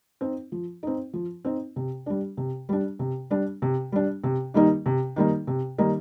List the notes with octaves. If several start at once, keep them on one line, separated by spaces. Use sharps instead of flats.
C4 D#4
F3
C4 D#4
F3
C4 D#4
C3
G3 D4
C3
G3 D4
C3
G3 D4
C3
G3 D4
C3
D#3 G3 A#3 D#4
C3
D#3 G3 A#3 D#4
C3
D#3 G3 A#3 D#4